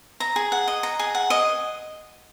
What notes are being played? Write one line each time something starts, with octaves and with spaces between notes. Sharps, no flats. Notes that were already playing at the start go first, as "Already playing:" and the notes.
A#5
G#4
F#5
D#5
A#5
G#4
F#5
D#5